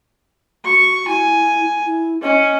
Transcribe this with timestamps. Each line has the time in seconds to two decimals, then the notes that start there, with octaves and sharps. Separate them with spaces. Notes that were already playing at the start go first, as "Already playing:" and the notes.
0.65 F#4 C#6
1.08 E4 G#5
1.86 E4
2.22 C#4 D#5